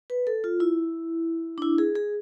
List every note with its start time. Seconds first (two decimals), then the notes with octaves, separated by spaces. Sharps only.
0.10 B4
0.27 A4
0.44 F4
0.60 E4
1.58 D4
1.62 E4
1.78 G#4
1.95 G#4